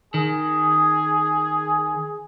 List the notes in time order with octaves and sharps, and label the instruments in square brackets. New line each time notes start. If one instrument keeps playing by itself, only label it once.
[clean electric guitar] D#3 [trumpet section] G#4